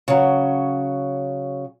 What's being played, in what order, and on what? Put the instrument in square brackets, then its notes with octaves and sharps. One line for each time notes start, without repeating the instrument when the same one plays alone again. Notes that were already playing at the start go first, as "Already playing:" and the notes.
[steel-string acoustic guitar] C#3 F#3